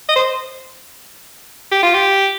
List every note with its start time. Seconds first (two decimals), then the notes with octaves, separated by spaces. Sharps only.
0.09 D#5
0.16 C5
1.72 G4
1.83 F4
1.94 G4